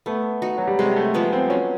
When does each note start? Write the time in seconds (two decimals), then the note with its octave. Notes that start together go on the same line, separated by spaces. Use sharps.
0.06 A3 B3
0.42 D#4 F#4
0.58 F#3
0.67 G3
0.79 C3 G#3
0.96 A3
1.14 F3 G#3 B3
1.33 C4
1.50 F#3 C#4